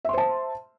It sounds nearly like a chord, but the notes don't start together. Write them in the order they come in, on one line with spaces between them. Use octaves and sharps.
E5 C6 C5 A5